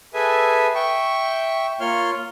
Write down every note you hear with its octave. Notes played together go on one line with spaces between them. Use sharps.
G#4 A4 B4 E5 G#5
E5 G5 C#6
A#3 F4 C#5 C6 F6